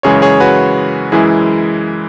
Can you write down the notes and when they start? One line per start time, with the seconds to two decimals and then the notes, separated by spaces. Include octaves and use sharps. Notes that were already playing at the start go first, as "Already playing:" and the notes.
0.03 F#2 C#3 E3 G#3 G#4 C#5
0.22 G#4 C#5
0.40 F#4 B4
1.12 F#2 E3 G#3 E4 G#4